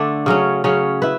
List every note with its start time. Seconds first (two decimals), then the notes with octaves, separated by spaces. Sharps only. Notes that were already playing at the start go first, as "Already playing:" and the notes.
Already playing: D3 A3 D4
0.26 C#3 F#3 C#4
0.64 C#3 F#3 C#4
1.02 E4 B4